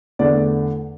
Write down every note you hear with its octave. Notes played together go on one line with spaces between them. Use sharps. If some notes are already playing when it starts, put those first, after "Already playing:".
E2 D3 A3 D4 D5